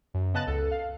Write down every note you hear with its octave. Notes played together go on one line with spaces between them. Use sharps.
F#2
C#3 B3 D#5 A5 F#6 A6
C#2 A4
F5